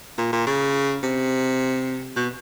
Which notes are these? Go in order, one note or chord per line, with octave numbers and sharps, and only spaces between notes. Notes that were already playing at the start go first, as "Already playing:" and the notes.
A#2
A#2
C#3
C3
B2